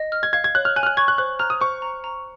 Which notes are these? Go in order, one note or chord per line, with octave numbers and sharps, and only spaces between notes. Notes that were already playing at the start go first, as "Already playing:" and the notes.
Already playing: D#5
F6
G#6
F5 G#6
G#6
C#5 F#6
F6
G#5 F#6
F6
F#6
C#6 G#6
F#6
C5 F#6
A#5 F6
D#6
C5 C#6
A#5
A#5